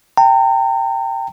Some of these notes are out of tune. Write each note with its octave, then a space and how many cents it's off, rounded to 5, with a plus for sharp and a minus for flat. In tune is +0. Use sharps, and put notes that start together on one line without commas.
G5 +0 A#5 -40